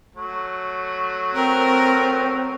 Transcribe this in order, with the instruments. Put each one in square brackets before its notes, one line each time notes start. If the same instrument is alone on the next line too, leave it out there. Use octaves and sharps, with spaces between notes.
[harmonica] F#3 A3
[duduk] C4 [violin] A#4